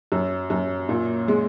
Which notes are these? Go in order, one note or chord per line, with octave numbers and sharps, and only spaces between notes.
F#2
F#2
A#2
G#3